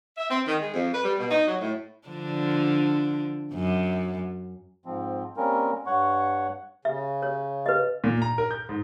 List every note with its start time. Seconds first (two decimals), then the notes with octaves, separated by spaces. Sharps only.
0.17 E5
0.29 C4
0.46 D#3
0.59 G#3
0.74 F2
0.92 B4
1.03 G3
1.17 B2
1.30 D#4
1.47 F#3
1.60 A2
2.08 D3 F3 D4
3.54 F#2
4.86 G#2 F3 C4
5.37 G3 A#3 C4 C#4 A#4
5.86 G2 C#5 F#5 C#6
6.85 C#3 E5
7.22 C#5
7.66 B4 D#5
8.04 A#2
8.22 A#5
8.38 A#4
8.51 G6
8.69 G#2